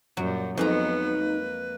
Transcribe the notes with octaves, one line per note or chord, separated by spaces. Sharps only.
F#2 A#2 F#3 G3
F2 F3 F#3 G#3 B3 D#4 B4 A#5
A#3